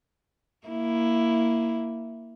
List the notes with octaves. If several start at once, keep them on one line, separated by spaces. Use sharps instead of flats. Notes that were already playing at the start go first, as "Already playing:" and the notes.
A#3 E4